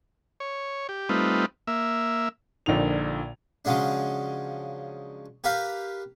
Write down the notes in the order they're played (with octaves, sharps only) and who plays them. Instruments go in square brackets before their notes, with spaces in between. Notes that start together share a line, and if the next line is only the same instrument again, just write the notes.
[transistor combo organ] C#5
G4
G3 A3 C4 D#4 F4 B4
A#3 E5
[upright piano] A#1 A#2 D3 D#4 F7
[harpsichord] C#3 F3 F#3 G#3 D4
G4 A#4 B4 F5